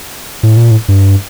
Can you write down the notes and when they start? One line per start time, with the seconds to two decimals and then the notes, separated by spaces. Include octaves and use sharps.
0.43 A2
0.57 A#2
0.71 A2
0.88 G2